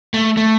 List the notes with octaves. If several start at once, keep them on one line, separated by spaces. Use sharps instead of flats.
A3
A3